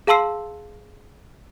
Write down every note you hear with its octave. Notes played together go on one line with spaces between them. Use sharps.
G#4 F5 A5 C6 E6 C7